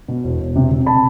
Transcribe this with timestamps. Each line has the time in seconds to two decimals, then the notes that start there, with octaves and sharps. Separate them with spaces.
0.08 B2
0.24 E1
0.40 E1
0.56 C3
0.71 C3
0.86 A5 B5